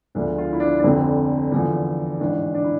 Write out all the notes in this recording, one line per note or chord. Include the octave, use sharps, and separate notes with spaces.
E1 D2 D3 F3 D4
F4
E4
D4
D4
F1 F2 D3 C4
E2 D3 F3
A1 G#2 E3 D4
D4
E4